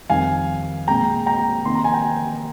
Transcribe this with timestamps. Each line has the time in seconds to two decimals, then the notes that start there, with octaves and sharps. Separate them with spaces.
0.10 F2 D#3 G3 F5 G#5
0.87 A#2 G#3 G5 A#5
1.26 G5 A#5
1.65 C3 D#3 A#3 C6
1.75 A#5
1.84 G#5
1.93 G5 A#5